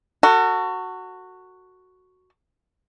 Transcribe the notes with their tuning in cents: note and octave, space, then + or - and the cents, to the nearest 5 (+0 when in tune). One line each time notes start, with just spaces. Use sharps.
F#4 +0 A4 +35